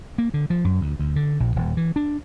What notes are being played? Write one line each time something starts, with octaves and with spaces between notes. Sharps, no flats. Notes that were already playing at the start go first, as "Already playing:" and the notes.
A#3
D3
F3
F#2
D2
D2
D3
A#1
D#1
E3
D4